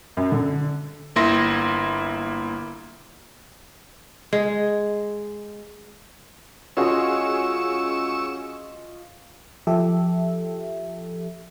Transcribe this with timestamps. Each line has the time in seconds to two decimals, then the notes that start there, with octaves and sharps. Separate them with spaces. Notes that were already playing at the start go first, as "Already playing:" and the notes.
0.17 F#2
0.32 D3
1.16 G1 A#3 E4 C6 A#6
4.33 G#3
6.77 C#4 F4 F#4 G#4 D#5 C#6 E6
9.67 F3 G4 A4 E5